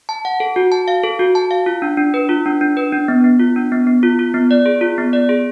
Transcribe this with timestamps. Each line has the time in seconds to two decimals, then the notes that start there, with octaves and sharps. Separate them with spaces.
0.09 A5
0.25 F#5
0.40 A4
0.56 F#4
0.72 A5
0.88 F5
1.03 A4
1.19 F#4
1.35 A5
1.51 F5
1.66 F4
1.82 D4
1.97 D4
2.14 B4
2.29 F4
2.46 D4
2.61 D4
2.77 B4
2.92 D4
3.08 B3
3.24 B3
3.39 F4
3.56 D4
3.72 B3
3.87 B3
4.03 F4
4.19 F4
4.34 B3
4.51 D5
4.66 G#4
4.81 F4
4.98 B3
5.13 D5
5.29 G#4